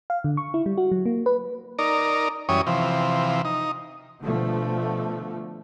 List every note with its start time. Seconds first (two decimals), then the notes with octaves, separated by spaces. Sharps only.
0.10 F5
0.24 D3
0.37 C#6
0.54 E4
0.66 G3
0.78 F#4
0.92 F#3
1.06 A#3
1.26 B4
1.79 D#4 A#4 D5
2.49 F#2 E3 G3 C#4 C#5 D#6
2.67 C3 E3 F3
3.45 D#4
4.21 B2 D3 F3 A3